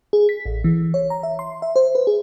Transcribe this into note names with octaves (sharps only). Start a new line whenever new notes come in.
G#4
B6
A1
E3
C#5
A#5
E5
C6
E5
C5
B4
G#4